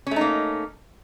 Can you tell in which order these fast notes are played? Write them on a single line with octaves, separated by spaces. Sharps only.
C#4 A3 D#4 A#3